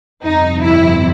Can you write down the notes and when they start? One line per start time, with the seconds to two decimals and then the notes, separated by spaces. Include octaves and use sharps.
0.23 G1 F2 C3 D#4
0.62 E4